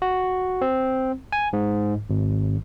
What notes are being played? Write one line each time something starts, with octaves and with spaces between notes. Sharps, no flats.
F#4
C4
G#5
G#2
G#1